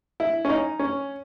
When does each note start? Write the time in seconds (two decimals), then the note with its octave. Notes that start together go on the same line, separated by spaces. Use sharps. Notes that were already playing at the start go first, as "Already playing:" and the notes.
0.20 E4
0.45 C#4
0.49 D#4
0.79 C#4